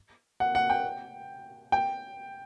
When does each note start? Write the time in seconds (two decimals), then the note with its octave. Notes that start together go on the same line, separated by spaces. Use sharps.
0.40 F#5
0.55 F#5
0.70 G5
1.72 G5